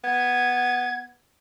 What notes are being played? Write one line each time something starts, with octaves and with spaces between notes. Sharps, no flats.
B3 G#6